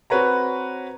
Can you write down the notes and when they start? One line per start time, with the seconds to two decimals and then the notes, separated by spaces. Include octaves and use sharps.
0.10 C4 F#4 B4 C#5 A#5